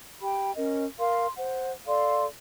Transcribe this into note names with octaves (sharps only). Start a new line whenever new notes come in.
G4 G5 B5
C#4 A#4 D#5
A#4 F5 C6
C5 F#5
A4 D5 F5 C6